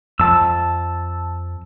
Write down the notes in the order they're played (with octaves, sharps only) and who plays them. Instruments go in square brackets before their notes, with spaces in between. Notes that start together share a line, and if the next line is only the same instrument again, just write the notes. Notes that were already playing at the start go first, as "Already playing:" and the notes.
[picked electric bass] F2 [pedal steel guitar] A5 E6